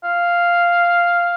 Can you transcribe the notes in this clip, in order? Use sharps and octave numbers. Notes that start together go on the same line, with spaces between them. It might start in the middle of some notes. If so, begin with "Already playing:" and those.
F5